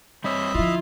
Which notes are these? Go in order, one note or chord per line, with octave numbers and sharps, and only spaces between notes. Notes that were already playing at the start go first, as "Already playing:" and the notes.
G3 C4 C#5 D#5 E5 B5
D3 F3 E4 F4